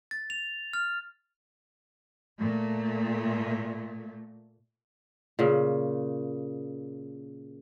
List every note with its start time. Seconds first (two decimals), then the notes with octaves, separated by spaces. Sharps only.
0.11 A6
0.30 F7
0.73 F6
2.39 A#2 A3
5.39 A#2 C#3